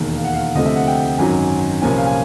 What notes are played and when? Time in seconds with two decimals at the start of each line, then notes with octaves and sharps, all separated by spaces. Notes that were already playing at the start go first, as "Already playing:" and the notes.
Already playing: E1 D#2 D#3
0.16 F5
0.24 F#5
0.34 F5
0.55 D2 C3 F3 A3 D#5
0.66 E5
0.76 F#5
0.87 G5
1.03 G5
1.18 G#1 F#2 D#3 F#3 G#5
1.82 C2 A#2 F3 A#3 C#4 G#5
1.97 F5
2.06 G#5